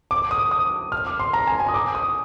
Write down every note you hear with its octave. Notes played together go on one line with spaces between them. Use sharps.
D6
D#6
D#6
F6
D6
C6
A#5
G#5
G#5
D#6
D6
D#6